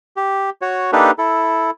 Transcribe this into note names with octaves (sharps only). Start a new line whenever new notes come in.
G4
F#4 C#5
A#3 D4 D#4 G4 A4 B4
E4 A4